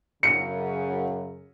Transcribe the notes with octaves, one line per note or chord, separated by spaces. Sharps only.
F#2 C#3 C#7